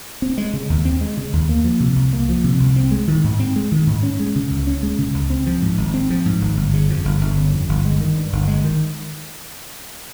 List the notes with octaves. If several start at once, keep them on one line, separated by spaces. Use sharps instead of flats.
C4
G#3
C#3
D#2
C4
G#3
C#3
D#2
A#3
F3
C3
C2
A#3
F3
C3
C2
C4
G#3
D#3
G#2
C4
G#3
D#3
G#2
C#4
G#3
C#3
C#2
C#4
G#3
C#3
C#2
C4
F3
G#2
G#1
C4
F3
G#2
G#1
G1
C#3
F2
G1
G1
C#3
F2
G1
G#3
D#3
G2
G1
G#3
D#3